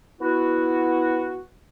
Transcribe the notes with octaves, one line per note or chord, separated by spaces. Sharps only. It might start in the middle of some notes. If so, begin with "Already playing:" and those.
B3 E4 F#4